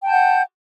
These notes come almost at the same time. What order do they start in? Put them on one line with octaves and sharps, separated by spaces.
G5 A5 G6 F#5